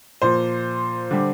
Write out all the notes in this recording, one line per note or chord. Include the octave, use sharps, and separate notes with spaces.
A#2 F3 C5
D3 G3